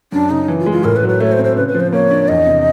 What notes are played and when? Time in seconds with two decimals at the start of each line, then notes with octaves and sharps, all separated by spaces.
0.12 F#2 D4
0.30 C#3 D#4
0.48 E3
0.60 F4
0.66 G#3
0.72 F4
0.84 A2 A#4
0.96 B4
1.03 F#3
1.09 B4
1.20 A3 C#5
1.32 C5
1.39 C4
1.44 C5
1.56 C#3 B4
1.68 B4
1.74 F3
1.80 C5
1.93 A#3 C#5
2.11 D4
2.28 E2 D#5
2.46 C3